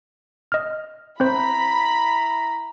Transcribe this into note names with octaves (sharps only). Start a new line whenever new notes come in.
D#5 F6
C4 E4 C5 A#5 B5